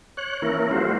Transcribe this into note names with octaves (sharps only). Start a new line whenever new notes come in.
C#5 F#6
E3 A#3 C#4 E4 A#4
G3 A3 F4 F#4 C5